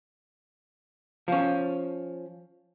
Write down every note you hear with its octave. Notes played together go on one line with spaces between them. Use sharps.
F3 C#4